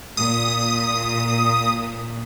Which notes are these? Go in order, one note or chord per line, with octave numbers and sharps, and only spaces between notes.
A#2 D#6